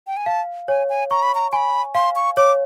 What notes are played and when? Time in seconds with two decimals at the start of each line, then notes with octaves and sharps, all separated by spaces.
0.07 G5
0.17 G#5
0.26 F5 A5
0.68 C#5 G#5
0.89 G#5
1.11 A#5 C#6
1.23 B5
1.35 A#5
1.52 G#5 B5 C6
1.95 F5 C6
2.16 C#6
2.37 C#5 D6